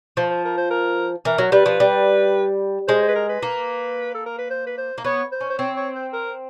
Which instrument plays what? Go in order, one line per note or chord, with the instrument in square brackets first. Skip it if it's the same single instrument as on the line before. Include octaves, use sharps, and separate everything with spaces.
[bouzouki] F3 [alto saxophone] C5
[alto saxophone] C5
A#4
C5
A#4
[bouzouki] E3 [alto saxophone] A#4
[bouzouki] F#3
[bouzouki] G3 [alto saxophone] B4
[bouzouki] F3
G3
[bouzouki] G#3 [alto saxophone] C5
[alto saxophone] C5
B4
A#4
B4
[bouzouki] A#3
[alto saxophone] A4
A#4
B4
C5
B4
C5
[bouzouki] A#3
[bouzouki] B3 [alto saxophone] C#5
[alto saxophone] C5
[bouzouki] C#4
[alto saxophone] C5
[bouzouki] C4 [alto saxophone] C#5
[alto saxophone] C#5
C5
A#4